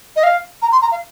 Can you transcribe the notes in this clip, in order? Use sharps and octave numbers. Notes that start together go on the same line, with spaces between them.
D#5
F5
A#5
C6
A#5
F5